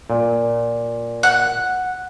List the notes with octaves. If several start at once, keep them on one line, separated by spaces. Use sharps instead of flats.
A#2
F#5